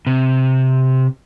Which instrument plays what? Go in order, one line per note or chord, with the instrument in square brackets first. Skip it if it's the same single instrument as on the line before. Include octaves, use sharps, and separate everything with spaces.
[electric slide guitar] C3